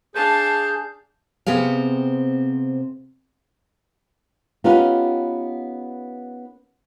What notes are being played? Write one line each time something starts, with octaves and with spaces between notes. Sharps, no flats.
D4 G#4 F5 A5 G6
C3 B3 C4 G#4 F5
B3 C#4 D#4 F4 G4 B4